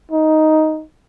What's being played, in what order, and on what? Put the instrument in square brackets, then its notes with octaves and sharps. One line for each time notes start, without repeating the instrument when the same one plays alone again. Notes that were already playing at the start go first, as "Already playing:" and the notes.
[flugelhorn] D#4